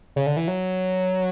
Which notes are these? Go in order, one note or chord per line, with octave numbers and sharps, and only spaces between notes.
C#3
D3
E3
F#3